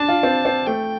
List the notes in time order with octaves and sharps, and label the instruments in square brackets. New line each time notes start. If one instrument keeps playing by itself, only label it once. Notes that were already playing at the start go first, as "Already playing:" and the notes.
Already playing: [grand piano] D4 [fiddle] A5
[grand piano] F4
C4
C4
[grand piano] A3 [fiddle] G5